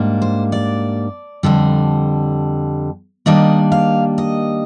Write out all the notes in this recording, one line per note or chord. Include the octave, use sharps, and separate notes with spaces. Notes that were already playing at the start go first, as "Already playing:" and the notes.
Already playing: G#2 G3 A#3 D4
C5
D5
F2 D3 G3
D#3 G3 A#3 D4 D#5
F5
D#5